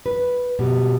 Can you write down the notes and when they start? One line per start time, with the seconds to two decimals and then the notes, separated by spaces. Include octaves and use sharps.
0.06 B4
0.59 B2 G3